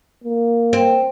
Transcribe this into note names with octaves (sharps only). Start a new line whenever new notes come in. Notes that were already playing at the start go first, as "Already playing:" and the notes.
A#3
C4